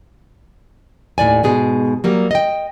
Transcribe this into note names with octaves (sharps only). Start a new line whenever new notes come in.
D#2 A2 D5 G#5
G#2 B2 G#4
F#3 G3 A#3
D#5 G5